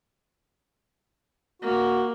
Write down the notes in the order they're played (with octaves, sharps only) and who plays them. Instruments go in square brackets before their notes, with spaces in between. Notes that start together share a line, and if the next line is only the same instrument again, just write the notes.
[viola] A#3 [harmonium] F#4